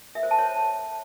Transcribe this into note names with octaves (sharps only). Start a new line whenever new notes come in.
E5
C5
A5
C#5